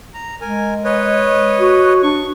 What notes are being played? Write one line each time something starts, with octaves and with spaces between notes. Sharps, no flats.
A#5
G#3 A#4 G#5
B4 C#5 D#5
F#4
D4 C#6